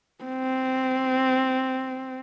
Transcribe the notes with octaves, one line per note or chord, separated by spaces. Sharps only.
C4